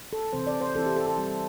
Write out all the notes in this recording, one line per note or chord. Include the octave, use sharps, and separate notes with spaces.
A4
C3 E3 C4 C5
D5
C5
E3 C4 E4 A4
G4
A4
A4
G3 C4 E4